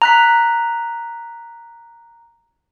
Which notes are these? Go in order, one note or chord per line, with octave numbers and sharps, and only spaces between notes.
A#5 F#6 B6